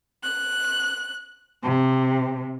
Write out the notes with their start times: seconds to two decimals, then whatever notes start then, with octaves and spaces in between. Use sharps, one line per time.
0.23 F#6
1.63 C3